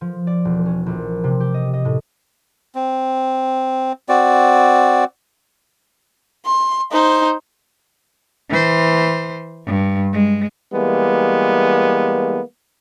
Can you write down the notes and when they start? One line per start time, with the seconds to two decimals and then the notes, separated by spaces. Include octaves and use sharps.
0.01 F3
0.27 D5
0.45 E1
0.66 C#4
0.86 A#1
1.24 C3
1.40 G4
1.54 D#5
1.73 D#5
1.85 A2
2.75 C4
4.09 C4 F#4 D5
6.45 C6
6.92 D#4 C5
8.50 E3 C5
9.65 G2
10.12 G#3
10.73 E3 G3 G#3 A#3 B3